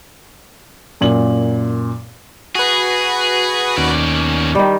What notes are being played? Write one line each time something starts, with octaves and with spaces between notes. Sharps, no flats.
F#2 A#2 F#7
F#4 G#4 B4
D#2 B2 C#4 D5
D#3 G3